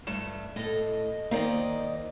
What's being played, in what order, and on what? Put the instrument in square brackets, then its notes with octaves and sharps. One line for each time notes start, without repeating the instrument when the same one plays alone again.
[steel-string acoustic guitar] G2 A3 [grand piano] E7
[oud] A2 A4 [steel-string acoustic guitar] D#5
[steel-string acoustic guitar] D#3 D5 D#5 [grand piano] A#3 [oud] C5